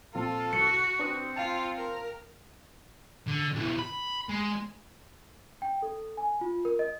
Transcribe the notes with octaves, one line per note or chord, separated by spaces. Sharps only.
A#2 F3 C4 F4 A4
C2 F#4 C#7
C4 D4 B4 D#6
F4 F5 G5 A5
A#4
D3
B1 E3
B5
G#3
G5
A4
G#5
F4
A#4
D#5